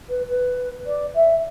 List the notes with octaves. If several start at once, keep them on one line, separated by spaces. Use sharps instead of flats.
B4
B4
D5
E5